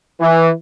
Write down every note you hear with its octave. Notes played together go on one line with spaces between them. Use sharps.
E3